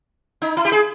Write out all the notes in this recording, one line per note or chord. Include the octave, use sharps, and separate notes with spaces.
D#4
E4
G4
G#4